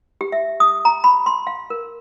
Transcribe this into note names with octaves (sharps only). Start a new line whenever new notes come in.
G4
E5
D#6
A#5
B5
C6
F5
A#4